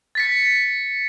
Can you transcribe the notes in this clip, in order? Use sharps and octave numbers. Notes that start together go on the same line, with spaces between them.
A6 B6 C#7